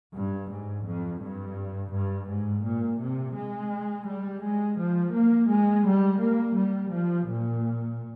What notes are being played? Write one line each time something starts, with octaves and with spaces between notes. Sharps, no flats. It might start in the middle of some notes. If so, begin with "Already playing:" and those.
G2
G#2
F2
G2
G2
G#2
A#2
C3
G#3
G3
G#3
F3
A#3
G#3
G3
A#3
G3
F3
A#2